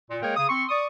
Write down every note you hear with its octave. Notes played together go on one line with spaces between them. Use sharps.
A#2
G#3 A#3 G#4 A#4 C#5 G5
C#3 D#6
C4 C6 C#6
D5 C#6 D#6